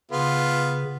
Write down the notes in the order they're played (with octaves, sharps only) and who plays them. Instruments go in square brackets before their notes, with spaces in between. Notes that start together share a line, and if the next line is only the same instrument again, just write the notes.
[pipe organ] C#3 [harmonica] B3 F4